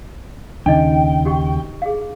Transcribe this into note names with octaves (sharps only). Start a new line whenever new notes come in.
D#2 C#3 D4 D#4 D#5 G5
F#4 G4 C#6
G#4 F5